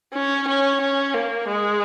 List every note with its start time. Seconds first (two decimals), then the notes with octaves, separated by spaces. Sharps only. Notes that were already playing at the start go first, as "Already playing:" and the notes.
0.13 C#4
0.48 C#4
0.81 C#4
1.14 A#3
1.48 G#3